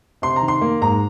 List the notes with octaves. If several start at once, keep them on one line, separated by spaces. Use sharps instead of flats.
C3 C6
A#5
D#3
C6
A#3
G#2 A#5